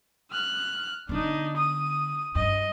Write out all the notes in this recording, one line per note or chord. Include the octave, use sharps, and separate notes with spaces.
F6 F#6
D3 B3 D4 D#4
D#6
G2 D#5